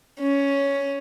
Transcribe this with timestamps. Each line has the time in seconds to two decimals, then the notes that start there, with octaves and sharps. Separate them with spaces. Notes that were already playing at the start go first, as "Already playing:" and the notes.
0.20 C#4